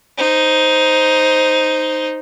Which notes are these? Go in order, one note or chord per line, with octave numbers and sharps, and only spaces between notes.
D#4 C5